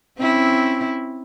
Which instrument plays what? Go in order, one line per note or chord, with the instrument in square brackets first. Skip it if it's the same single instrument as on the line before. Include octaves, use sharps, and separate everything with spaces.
[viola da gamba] C4 C#4 E4